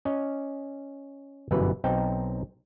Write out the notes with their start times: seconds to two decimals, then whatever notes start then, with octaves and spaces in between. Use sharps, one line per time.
0.05 C#4 D#5
1.51 G1 F#2 B2 E3 B4
1.84 B1 C4 D#4 G5 A5